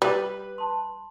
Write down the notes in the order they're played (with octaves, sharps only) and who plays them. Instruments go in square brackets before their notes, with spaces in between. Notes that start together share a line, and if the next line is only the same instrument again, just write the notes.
[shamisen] G3 [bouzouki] B4
[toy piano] A5 C6